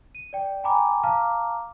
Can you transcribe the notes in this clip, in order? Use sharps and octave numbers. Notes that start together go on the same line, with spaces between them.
D#7
D5 G5
G5 G#5 A#5 B5 D6
F5 A5 A#5 D6 F6